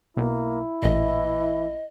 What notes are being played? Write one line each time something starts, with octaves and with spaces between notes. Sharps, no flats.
B1 A#3 E4
A1 A#2 E3 D#5